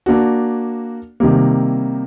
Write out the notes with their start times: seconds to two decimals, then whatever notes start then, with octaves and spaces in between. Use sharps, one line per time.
0.06 A#3 D4 F#4
1.20 C3 D#3 G3 A#3